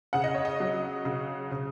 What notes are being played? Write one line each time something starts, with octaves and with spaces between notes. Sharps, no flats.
C#3 F#5
D#5
C#5
D#5
F#3
C#3
C#3